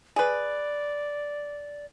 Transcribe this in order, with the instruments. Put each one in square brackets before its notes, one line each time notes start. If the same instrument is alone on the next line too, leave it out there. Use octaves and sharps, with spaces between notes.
[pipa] G#4 B4 [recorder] D5